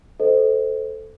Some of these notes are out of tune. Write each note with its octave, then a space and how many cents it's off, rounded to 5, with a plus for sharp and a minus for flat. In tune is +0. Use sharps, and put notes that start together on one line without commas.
A4 +0 C5 -20 D#5 +0